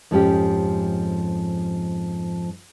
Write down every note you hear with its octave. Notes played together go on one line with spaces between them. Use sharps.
F2 G#2 F3 G#3 C#4 G4